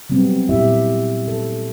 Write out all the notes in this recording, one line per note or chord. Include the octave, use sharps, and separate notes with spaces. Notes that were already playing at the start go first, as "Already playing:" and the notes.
F#3 G3 B3 C4
A#2 E4 G4 E5
A4